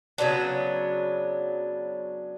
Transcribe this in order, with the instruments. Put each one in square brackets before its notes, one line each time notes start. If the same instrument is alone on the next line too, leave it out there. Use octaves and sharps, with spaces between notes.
[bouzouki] C#3 F#3 B3 D4